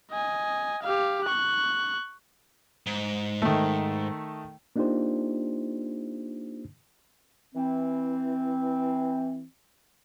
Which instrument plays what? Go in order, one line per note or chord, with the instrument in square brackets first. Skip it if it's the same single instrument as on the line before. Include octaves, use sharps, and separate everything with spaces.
[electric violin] D#5 G#5
G4 F5
C#6 F#6
[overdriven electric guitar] G#2
[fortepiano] D#3 A3
[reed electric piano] A#3 D4 D#4 F4 G4 C5
[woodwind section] E3 C4